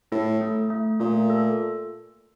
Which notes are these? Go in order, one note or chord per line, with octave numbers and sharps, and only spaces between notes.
A2 A4
A3
A3
A#2 A3
A4